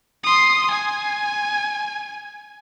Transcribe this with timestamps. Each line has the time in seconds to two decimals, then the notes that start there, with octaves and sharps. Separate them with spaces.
0.23 C6 D#6
0.70 G#5